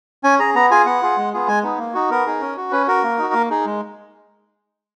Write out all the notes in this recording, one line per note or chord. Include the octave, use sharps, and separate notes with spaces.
C#4 G#5
G#4 A#5
B3 A#5
F4 G#4 G#5
B3 F#5
F4 G#4
G#3
B3 F4 G#4
G#3 G#5
B3 D#4
A#3
D#4 F#4
B3 A#4
D#4 G#4
C#4
F#4
C#4 B4
F#4 A#4
A#3
D#4 F#4
A#3
D#4 G#4
G#3